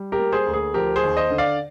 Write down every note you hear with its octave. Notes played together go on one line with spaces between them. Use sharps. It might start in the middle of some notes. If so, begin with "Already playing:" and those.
Already playing: G3
G4 A#4
A#3
G#4 C5
D2
G#4
F3 G4 A#4
G#4 C5
D#2
C5 D#5
D3
D5 F5